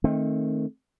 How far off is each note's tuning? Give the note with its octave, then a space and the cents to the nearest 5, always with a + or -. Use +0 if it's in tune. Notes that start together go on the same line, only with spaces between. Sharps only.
D#3 +5 A3 +0 C4 +30